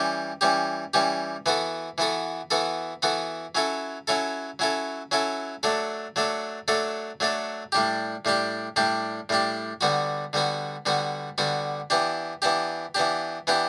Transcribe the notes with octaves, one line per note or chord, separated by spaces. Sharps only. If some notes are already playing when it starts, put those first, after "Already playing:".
Already playing: E3 G3 C#4 G4
E3 G3 C#4 G4
E3 G3 C#4 G4
E3 B3 F#4 A4
E3 B3 F#4 A4
E3 B3 F#4 A4
E3 B3 F#4 A4
F#3 C#4 E4 A4
F#3 C#4 E4 A4
F#3 C#4 E4 A4
F#3 C#4 E4 A4
F#3 A3 D4 A4
F#3 A3 D4 A4
F#3 A3 D4 A4
F#3 A3 D4 A4
A2 G3 D4 G4
A2 G3 D4 G4
A2 G3 D4 G4
A2 G3 D4 G4
D3 G3 B3 F#4
D3 G3 B3 F#4
D3 G3 B3 F#4
D3 G3 B3 F#4
E3 B3 D4 G4
E3 B3 D4 G4
E3 B3 D4 G4
E3 B3 D4 G4